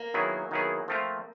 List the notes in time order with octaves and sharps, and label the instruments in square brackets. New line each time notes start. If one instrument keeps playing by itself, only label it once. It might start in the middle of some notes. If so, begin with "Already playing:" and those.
Already playing: [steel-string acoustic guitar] A#3
[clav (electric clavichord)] D#3 F#3 B3 E4 G#4
D#3 F#3 B3 E4 G#4
F3 A3 C4 F4